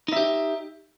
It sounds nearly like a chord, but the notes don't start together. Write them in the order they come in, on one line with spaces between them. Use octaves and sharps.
D#4 E5 G4